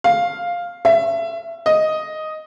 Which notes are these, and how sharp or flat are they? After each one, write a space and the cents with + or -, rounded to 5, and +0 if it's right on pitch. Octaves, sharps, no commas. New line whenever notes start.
F5 +0
E5 +25
D#5 +0